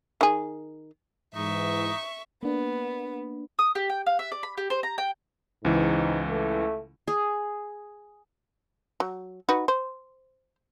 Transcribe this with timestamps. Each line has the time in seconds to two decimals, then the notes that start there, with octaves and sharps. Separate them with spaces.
0.21 D#3 G#4
1.35 G#2 E3 D#4 E5 C#6
2.43 A#3 B3 D4
3.59 D#6
3.75 G4
3.90 G5
4.06 F5
4.19 E5
4.32 D5
4.43 B5
4.58 G4
4.70 C5
4.83 A#5
4.98 G5
5.65 C#2 G#2 E3
6.30 A3
7.08 G#4
9.00 F#3
9.49 D#4 F#4 B4
9.68 C5